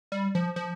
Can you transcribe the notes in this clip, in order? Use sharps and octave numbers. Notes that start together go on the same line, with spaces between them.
G3
F3
F3